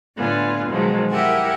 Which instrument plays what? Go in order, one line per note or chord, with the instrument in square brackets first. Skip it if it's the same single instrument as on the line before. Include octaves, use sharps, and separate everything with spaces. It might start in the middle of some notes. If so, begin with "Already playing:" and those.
[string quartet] A2 D3 B3 F4 G#5
B2 D#3 F3 F#3 G#3
E4 G4 A#4 E5 F#5 G#5